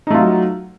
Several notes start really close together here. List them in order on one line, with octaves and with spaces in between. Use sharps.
D#4 A3 F4 F#3